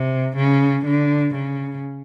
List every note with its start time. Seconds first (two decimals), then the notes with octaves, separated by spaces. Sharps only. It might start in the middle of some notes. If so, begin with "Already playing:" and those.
Already playing: C3
0.36 C#3
0.85 D3
1.34 C#3